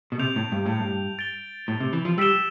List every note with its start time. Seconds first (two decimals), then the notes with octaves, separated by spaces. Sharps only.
0.12 B2
0.19 C3 G6 D7 F7
0.36 A2
0.52 G2
0.66 A2
0.80 G2
1.19 A6 D7 G7
1.68 A2
1.80 C3
1.93 E3
2.05 F3
2.18 G3 E6 B6 E7 G7